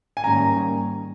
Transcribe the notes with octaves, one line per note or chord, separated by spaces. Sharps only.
G#5
G#2 D#3 G3 A#3 C#4 A#5